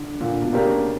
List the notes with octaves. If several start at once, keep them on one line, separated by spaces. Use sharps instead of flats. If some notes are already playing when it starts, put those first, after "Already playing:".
Already playing: D3
A#2 D3
B2
C#3 A#3 D4 G4 A#4